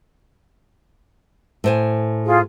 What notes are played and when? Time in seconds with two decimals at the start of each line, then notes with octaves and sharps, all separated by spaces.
1.64 A2 C5 G#5
2.24 F4 G#4